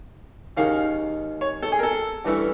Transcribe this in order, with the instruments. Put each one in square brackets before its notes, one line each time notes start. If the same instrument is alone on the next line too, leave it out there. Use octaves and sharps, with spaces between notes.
[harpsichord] D#2 D#3 G#3 C#4 [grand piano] F5
[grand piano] C#5
A4
G#4
A#4
A4
[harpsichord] G2 E3 A3 C#4 E4